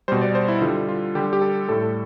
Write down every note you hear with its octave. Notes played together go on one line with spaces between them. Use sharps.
B2 G3 C5
D5
C5
E4
D3 G3 F4
F4
D3 G3 G4
G4
A4
A2 G3 A4